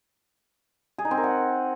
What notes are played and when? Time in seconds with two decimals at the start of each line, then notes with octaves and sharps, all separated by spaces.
0.98 G#4
1.05 D#4
1.11 C4
1.17 A#4
1.24 F#5